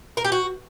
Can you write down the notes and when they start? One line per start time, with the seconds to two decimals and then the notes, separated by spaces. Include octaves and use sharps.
0.17 A#4
0.25 G4
0.32 F#4